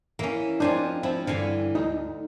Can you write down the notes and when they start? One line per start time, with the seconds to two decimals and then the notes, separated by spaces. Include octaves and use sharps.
0.19 E3 A#3 C#4
0.60 F3 C4 D4 D#4 C5 G#5
1.03 F3 C4 E4
1.27 G2 D3 E3 F5 G#5
1.75 D2 D#4